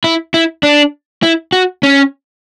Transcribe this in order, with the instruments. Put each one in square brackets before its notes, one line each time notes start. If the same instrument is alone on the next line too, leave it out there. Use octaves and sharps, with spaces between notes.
[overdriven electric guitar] E4
E4
D4
E4
F#4
C#4